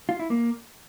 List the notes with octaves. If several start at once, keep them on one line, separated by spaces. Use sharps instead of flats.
F4
E4
A#3